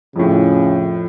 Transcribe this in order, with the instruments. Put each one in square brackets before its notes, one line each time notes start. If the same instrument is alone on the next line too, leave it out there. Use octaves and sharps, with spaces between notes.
[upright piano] F2 A2 [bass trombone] C#3